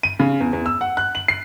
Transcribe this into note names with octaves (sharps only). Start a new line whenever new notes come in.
D#7
C#3
E2
E2
E6
F#5
F#6
F#7
C7